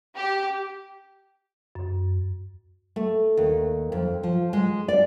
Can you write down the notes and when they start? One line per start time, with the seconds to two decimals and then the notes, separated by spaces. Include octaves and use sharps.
0.17 G4
1.75 F#2
2.96 A3
3.37 D#2
3.92 F2
4.23 F3
4.53 G#3
4.88 D5